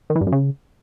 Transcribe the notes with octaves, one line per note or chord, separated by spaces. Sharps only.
D#3
E3
G2
F#2
C#3